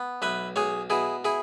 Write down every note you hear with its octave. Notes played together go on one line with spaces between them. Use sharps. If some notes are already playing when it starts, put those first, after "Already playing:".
Already playing: B3
B1 B4 E5
B1 G#4 C#5
B2 E4 G#4
E4 G#4